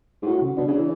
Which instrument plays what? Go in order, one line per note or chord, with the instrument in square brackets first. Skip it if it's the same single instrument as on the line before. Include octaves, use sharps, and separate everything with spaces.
[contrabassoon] G#2
[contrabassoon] A2 [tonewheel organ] F#4
[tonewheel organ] C#3
[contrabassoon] B2 [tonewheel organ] D4
[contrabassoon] C#3
E3